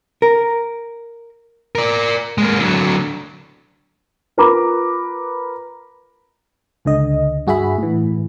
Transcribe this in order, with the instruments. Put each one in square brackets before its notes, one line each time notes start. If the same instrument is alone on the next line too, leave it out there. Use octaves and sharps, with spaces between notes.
[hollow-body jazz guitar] A#4
[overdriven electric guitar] A#4 D5
G#3 A#3
D3 F#3
[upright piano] F4 A#4 B4 A#5 B5 D6
[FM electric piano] C#2 D3 D#5
G2 F#4 G#4 E5 B5
A2 E3